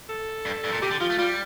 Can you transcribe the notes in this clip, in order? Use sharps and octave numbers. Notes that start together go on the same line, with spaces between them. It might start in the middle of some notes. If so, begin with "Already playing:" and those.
A4
G2
G2
A#2
C3 G4
D3
F3 F4
A3
G3 F4